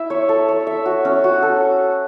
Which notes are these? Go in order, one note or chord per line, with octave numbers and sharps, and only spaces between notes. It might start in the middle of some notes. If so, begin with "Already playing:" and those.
Already playing: E4 E5
C#5
A4
C#5
E5
F#4
C#4
F#4
A4